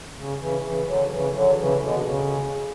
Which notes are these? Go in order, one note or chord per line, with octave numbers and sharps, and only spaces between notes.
C#3
C#3 E3
C#3 E3
D3 F#3
C#3 E3
D3 F#3
C#3 E3
B2 D3
B2
C#3